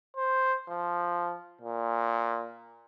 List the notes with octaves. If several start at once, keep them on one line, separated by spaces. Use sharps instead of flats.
C5
F3
A#2